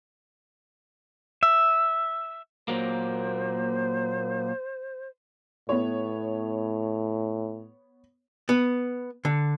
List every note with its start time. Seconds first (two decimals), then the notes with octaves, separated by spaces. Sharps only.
1.43 E5
2.68 A#2 F#3 A#3 C5
5.69 A2 B3 C#5
8.49 B3
9.25 D3